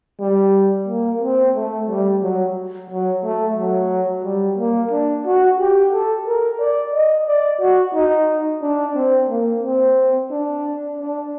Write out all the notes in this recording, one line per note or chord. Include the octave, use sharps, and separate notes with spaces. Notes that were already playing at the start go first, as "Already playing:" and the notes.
G3
A#3
C4
A3
G3
F#3
F#3
A3
F#3
G3
A#3
D4
F#4
G4
A4
A#4
D5
D#5
D5
F#4
D#4
D4
C4
A#3
C4
D4
D4